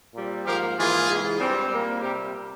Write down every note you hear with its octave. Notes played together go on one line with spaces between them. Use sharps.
A#2 G3 C4
G#2 F3 A#3 G4 A#4
G#2 E3 A#3 F4 G#4
C3 E3 G#3
G2 G3 C4
A#2 G3 A#3
C3 G3 C4 G4 A#4